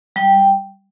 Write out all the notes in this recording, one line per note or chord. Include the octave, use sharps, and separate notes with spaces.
G3 G5